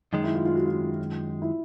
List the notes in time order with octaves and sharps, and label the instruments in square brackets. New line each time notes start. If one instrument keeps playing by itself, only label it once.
[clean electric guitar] F#2 D#3 G#3 [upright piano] D#4
[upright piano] E4
F4
F4
F#4
F4
E4